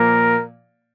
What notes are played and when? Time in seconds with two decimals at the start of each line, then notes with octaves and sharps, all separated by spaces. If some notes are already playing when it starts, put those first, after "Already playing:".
Already playing: A#2 F3 A#3 A#4